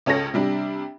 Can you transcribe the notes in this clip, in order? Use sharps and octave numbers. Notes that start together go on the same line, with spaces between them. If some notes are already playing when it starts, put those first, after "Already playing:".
C#2 C#4 A4 C#5 A#6
C3 G3 D4